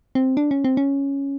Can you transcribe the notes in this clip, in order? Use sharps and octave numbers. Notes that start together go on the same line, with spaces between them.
C4
D4
C#4
C4
C#4